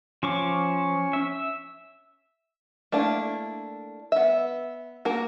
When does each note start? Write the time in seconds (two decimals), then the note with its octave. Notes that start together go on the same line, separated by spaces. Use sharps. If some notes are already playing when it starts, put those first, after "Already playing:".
0.23 F3 C#4 C#6 D6
1.13 E5
2.92 A3 A#3 D4 E4
4.12 B3 E5
5.05 A#3 F#4 A#4